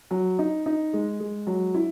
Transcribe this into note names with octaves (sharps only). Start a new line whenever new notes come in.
F#3
D#4
D#4
G#3
G#3
F#3
E4